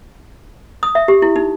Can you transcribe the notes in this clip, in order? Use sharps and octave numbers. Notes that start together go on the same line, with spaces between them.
D#6
E5
G4
E4
D#4